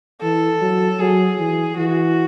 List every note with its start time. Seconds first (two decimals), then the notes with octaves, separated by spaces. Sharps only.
0.21 E3 A4
0.61 F#3
0.99 F#3 G#4
1.38 E3
1.77 E3 F#4